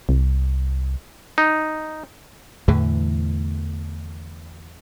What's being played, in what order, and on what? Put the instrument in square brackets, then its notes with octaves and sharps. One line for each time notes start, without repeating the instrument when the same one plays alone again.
[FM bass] C2
[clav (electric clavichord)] D#4
[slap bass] E2 A2 D3 E3